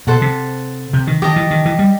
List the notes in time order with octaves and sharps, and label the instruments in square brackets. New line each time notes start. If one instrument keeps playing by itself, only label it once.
[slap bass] B2 [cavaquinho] A4 C5 F#5 A5
[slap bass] C3
C3
D#3
[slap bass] D#3 [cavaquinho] G4 D#5 A5
[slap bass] E3
D#3
E3
G3